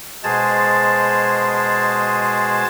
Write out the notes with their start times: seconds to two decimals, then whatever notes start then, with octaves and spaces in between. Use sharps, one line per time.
0.24 B2 G#3 G#4 C5 A5 A6